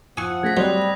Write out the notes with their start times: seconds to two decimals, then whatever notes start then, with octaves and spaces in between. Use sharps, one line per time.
0.17 F3 F#5 G#5 C#6 D#6 E6
0.43 A3 C#4 G#4 G#6 A#6 B6
0.57 F#3 G3 C4 C5 D#5 F#6 F7